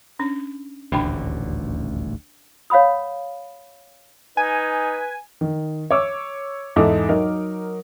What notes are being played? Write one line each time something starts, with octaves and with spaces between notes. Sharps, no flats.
C#4 D4
D#1 A1 D2 D4 G5 B5
C#5 F5 F#5 B5 D#6
D#4 B4 G#5
D#3
C#5 D6 E6
E2 G#2 D#4 A4 E5 D6
F#3 D#4 A#4